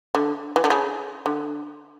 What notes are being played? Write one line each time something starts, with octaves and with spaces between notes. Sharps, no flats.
D3
E3
D3
C#3
D3